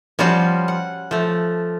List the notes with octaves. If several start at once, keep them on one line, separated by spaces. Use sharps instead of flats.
F3 G3 C#4 F4 F#4
F#5
F3 A3